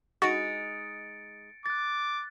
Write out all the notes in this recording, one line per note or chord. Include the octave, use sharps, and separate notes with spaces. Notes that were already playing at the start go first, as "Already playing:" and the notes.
G#3 D#4 F#4 A6 C#7 D7
D6 F#6 A6